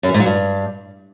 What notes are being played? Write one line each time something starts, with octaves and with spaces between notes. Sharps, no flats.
F#2
E3
G#2
F#3
G2